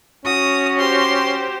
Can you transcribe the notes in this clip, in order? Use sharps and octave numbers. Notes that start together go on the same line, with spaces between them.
C#4 F#4 D#6
G4 C5 C6